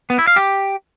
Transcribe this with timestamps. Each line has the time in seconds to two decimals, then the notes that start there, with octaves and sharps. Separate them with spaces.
0.10 B3
0.19 E4
0.27 F5
0.36 G4